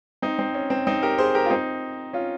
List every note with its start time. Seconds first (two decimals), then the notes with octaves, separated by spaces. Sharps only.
0.22 C4 D#4
0.39 C4
0.54 C#4
0.70 C4
0.87 C4 D#4
1.03 G4 A#4
1.18 G#4 C5
1.35 G4 A#4
1.46 F4
1.50 C4 D#4
2.13 C#4 F4